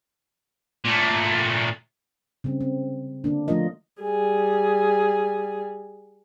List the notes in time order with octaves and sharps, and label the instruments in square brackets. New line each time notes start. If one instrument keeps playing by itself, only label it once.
[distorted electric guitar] A#2 A3
[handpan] C#3 G3 C4
C4
D3 A#3 D4
F3 A3 D4 F4 A#4 D#5
[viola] G3 G#4